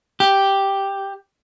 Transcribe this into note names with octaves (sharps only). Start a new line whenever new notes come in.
G4